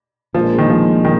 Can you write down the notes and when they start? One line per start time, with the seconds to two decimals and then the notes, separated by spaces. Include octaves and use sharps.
0.34 A#1 A#2 F3 G#3
0.58 D#3
0.70 F3
1.05 D#3